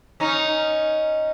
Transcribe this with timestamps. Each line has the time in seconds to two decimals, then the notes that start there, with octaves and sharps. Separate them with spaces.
0.20 C#4 D#4